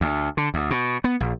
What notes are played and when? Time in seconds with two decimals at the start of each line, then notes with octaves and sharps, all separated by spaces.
0.01 D2
0.37 D3
0.54 D2
0.71 B2
1.04 B3
1.20 A#1